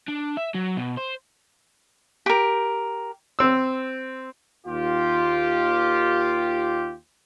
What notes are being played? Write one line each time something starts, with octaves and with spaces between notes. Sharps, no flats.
D4
E5
F#3
B2
C5
G4 A#4
C4 E6
D#2 F4 G4